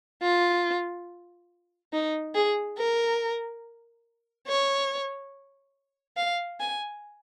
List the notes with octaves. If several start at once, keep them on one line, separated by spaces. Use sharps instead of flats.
F4
D#4
G#4
A#4
C#5
F5
G#5